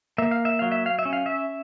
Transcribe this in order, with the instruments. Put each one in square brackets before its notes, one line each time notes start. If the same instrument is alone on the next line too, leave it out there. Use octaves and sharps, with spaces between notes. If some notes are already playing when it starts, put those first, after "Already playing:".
[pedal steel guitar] A#3 E5
F5
E5
F#3 F5
E5
F5
E5
C#4
F5
E5